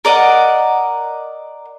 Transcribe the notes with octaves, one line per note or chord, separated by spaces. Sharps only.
A#4 D5 D#5 F#5